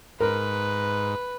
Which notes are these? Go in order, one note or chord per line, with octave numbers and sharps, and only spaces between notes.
G#2 A#4 B4